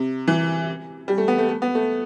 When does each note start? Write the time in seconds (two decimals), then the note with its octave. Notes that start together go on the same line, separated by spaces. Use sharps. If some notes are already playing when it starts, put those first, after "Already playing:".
Already playing: C3
0.28 E3
1.08 G3
1.18 A3
1.28 B3
1.38 A3
1.49 A3
1.62 B3
1.75 A3